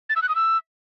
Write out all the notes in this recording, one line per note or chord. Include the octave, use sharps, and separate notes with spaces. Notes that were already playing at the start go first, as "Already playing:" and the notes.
A6
E6
F#6
D#6
E6